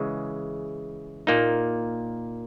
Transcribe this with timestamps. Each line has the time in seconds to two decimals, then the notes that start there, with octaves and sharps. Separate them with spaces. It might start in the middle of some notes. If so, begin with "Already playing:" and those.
Already playing: C#3 E3 G#3
1.27 A#2 A#3 D#4